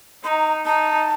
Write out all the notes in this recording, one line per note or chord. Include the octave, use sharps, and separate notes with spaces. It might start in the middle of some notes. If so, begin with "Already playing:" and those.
D#4 A#5 C6
D#4 A5